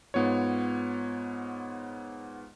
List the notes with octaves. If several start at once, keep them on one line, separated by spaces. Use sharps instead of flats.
G#2 B3 F4 C#5